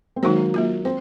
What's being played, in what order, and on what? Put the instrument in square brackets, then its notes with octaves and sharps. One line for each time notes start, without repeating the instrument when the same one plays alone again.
[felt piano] C4
[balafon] D#3 G#3 D#4 F#4 C5 [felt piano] F#3 A#3
[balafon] F#3 A#3 F4
[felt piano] C4 [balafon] C5